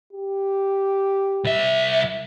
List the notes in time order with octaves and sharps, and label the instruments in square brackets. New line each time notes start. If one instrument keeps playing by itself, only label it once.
[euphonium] G4
[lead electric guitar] C2 E5